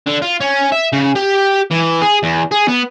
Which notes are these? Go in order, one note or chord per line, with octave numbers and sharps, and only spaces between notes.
D3
F4
C#4
E5
C#3
G4
E3
G#4
E2
G#4
B3